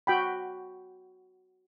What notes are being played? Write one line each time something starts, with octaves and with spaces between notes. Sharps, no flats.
F#4 G5 B5